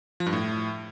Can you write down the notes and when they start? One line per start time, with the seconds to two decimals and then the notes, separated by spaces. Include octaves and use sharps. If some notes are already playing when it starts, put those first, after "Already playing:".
0.20 F3
0.26 G2
0.33 A2